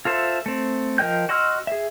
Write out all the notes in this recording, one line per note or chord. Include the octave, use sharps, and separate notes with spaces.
F4 A4 C5 E5
A3 C4
F3 A#4 D#5 G5 G6
F#4 D#5 C6 E6 F6
G#4 E5